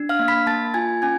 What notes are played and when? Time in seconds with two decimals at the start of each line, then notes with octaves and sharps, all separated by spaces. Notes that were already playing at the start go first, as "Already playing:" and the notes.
Already playing: D4
0.09 F5 F6
0.19 A#3
0.28 B5 B6
0.46 A#3 A5 A6
0.74 F4 G#5 G#6
1.02 C#4 G#5 G#6